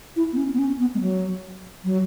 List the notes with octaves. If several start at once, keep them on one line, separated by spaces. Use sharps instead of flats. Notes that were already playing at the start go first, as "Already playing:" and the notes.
E4
B3
C#4
B3
C#4
B3
G#3
F#3
F#3